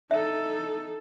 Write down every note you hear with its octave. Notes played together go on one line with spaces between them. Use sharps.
D#4 A4 E5